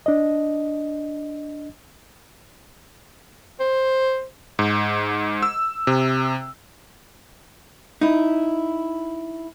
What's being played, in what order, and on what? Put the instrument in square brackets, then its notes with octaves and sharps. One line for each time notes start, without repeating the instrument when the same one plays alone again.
[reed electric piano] D4 D#5
[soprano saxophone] C5
[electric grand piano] G#2
E6
C3
[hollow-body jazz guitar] D#4 E4